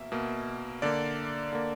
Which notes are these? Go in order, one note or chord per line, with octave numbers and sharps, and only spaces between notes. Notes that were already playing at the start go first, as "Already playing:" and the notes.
Already playing: B2 A#3 E5
B2 A#3
D3 A#3 D5
D3 A#3